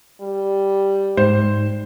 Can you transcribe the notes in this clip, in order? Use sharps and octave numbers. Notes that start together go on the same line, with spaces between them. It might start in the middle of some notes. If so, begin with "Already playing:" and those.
G3
G#2 C5